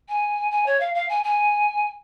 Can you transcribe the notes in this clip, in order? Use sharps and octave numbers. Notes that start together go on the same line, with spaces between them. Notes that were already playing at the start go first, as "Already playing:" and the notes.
G#5
G#5
C#5
F5
F5
G#5
G#5